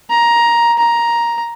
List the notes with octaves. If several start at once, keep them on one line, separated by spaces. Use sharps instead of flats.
A#5
A#5